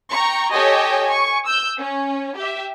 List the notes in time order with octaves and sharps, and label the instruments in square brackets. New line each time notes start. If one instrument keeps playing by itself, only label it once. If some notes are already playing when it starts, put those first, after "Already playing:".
[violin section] G5 A#5 C#6
G4 A4 C#5 D#5 G5 G#5
G#5 C#6
E6 G6
C#4
G4 E5